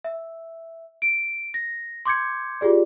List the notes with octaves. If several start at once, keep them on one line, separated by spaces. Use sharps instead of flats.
E5
D7
A#6
C6 D6 G6 G#6 C#7
F4 G4 G#4 D5